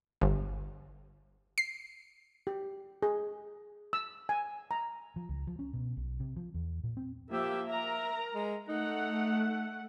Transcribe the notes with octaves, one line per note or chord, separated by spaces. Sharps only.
G1
C7
G4
G#4
E6
G#5
A#5
F3
C#2
F3
C#4
B2
B1
C3
F3
E2
A#2
C4
F3 A#3 G4 E5
A#4 E5 A#5
G#3
A3 D#4 F#5